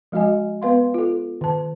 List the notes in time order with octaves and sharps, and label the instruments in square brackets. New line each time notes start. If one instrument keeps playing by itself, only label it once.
[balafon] F3 G#3 F#4 D#5 G#5
B3 B4 F5 C6
F4 A4
D#3 A5